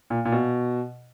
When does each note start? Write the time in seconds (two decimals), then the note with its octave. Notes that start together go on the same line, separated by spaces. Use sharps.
0.10 A#2
0.25 A#2
0.32 B2